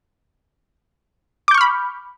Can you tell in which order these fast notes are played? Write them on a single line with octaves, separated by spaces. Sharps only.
D6 G6 C#6 F6 B5